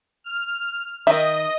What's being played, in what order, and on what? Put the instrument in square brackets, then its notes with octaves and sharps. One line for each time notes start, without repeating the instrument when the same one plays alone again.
[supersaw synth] F6
[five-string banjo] D#3 E5 [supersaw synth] D#5